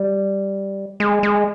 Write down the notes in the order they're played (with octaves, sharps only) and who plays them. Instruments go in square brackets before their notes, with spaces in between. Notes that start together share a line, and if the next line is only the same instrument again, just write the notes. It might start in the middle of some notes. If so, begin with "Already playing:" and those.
Already playing: [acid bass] G3
G#3
G#3